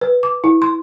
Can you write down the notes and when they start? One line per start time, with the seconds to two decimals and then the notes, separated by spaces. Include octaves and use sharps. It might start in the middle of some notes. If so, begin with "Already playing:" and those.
0.01 B4
0.23 D6
0.44 E4
0.62 C6